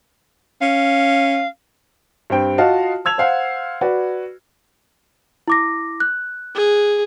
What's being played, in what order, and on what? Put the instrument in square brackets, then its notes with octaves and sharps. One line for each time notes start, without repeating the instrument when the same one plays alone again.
[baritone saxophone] C#4 [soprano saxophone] F5
[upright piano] G2 C4 G5
F4 F#4 D#5 F5 A5
A5 E6 G#6 F7
C5 F5 F#5
F#4 B4 D5
[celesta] E4 D6 A#6
F#6
[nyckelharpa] G#4